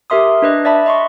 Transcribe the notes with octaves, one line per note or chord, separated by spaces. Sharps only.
G4 A#4 E5 C6 D#6
D4 B4 D#5
D5 E5 A5 B5
D#5 C6 C#6